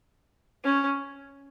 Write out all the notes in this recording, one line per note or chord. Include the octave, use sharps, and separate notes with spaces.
C#4